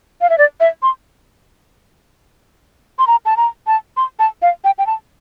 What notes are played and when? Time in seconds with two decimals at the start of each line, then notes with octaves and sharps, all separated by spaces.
0.21 F5
0.30 E5
0.38 D5
0.60 E5
0.83 C6
2.99 C6
3.07 A#5
3.25 A5
3.37 A#5
3.67 A5
3.97 C6
4.19 A5
4.42 F5
4.64 G5
4.78 G5
4.87 A5